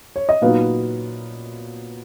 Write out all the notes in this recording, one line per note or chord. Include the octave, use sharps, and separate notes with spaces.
C#5
D#5
A#2 F#3 B3 D#4 F5